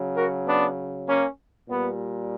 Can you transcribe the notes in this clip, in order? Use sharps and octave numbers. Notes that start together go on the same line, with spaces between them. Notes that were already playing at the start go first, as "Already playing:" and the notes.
Already playing: C#3 F#3
F#4 A#4
B3 D4
A#3 C#4
A#2 G3 B3